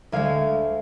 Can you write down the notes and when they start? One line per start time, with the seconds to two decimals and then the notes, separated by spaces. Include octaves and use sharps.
0.12 D2 D3 G#3 F5 G#5